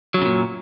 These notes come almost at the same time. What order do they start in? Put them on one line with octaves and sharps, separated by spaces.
F#3 F#2 C#3 A#2